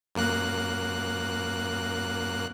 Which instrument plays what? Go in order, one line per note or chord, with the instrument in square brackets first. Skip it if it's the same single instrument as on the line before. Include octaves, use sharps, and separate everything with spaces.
[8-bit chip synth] F#2 A#3 F#6